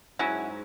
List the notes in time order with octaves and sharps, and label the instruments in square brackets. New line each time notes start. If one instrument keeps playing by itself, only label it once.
[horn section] G#2 [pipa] F#3 C#4 E4